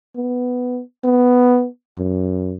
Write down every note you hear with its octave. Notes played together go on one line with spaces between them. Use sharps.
B3
B3
F#2